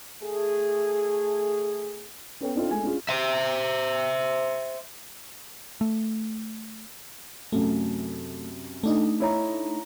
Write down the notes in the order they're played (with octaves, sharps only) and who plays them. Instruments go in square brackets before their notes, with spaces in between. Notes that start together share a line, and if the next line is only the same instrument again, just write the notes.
[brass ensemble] A3 G#4
[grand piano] B3 C#4 A4 C#5 G5
C4 D4 D#4 F4 A4
G#3 A3 G#5
C#4 D4 F4 G#4
[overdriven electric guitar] C5 E5
[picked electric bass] A3
[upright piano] F#2 C3 [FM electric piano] A3
[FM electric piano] A3 D4 D#4
[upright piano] E4 C#5 A#5